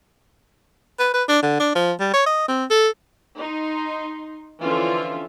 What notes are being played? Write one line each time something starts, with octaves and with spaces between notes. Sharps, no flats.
B4
B4
D4
D3
D4
F3
G3
C#5
D#5
C4
A4
D#4 C6
D3 E3 F3 C#4 F4 E5